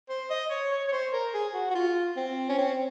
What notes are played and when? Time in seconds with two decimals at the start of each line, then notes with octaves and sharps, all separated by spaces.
0.09 C5
0.30 D#5
0.50 C#5
0.71 C#5
0.88 C#5
0.92 C5
1.13 A#4
1.34 G#4
1.54 F#4
1.70 F#4
1.75 F4
2.17 C4
2.49 C#4
2.58 C4